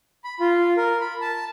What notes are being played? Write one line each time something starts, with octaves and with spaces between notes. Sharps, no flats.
B5
F4
A#4
B5
A5